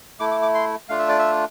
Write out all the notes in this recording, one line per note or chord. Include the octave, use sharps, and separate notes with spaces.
A3 E4 D6
D6
D6
C6
A3 D4 F4 F5
E5
D5
E5